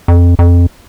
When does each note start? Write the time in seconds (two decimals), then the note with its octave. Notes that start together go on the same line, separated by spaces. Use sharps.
0.08 F2
0.39 F2